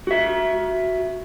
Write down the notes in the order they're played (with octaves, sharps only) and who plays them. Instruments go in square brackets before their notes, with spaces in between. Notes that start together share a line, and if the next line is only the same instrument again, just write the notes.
[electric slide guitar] F#4 E5